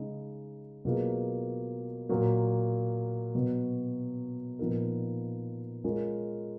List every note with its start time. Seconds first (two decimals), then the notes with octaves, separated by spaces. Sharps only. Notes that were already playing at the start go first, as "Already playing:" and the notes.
Already playing: C#3 G#3 D#4
0.85 B2 F#3 A#3 F4 G#4
2.09 A#2 F#3 A#3
3.35 B2 F#3 B3
4.59 A#2 F3 B3 D#4 A#4
5.84 G#3 C#4 F4 A#4